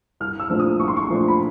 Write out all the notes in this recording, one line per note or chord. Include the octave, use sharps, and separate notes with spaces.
C2 F6
E6
A#2 F3 A3 D4
D#6
C2 C#6
C6
C#6
A#2 F3 A3 D4
B5